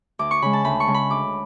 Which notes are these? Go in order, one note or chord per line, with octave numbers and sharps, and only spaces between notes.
D2 D6
C#6
C#3 G#3 B5
A5
D2 B5
C#6
C#3 G#3
B5
D2 D6